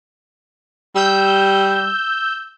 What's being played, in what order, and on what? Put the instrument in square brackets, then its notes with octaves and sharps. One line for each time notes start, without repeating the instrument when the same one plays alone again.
[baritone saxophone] G3 [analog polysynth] E6 G6